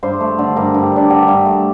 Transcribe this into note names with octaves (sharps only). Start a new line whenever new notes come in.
G2 C5
A3
D3
G2 A#4
G2
G4
G2 D4
D3 G4
G2
A3